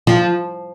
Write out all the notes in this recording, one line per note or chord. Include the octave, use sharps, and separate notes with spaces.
F3